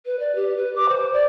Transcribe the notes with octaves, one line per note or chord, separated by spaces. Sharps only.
B4
D5
G4
B4
D6
C5
D5